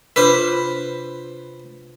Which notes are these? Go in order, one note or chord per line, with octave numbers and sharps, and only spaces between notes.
C3 D4 F4 B4 C5